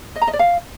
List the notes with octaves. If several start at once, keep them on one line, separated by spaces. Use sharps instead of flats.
D#5
A#5
D#5
D5
F5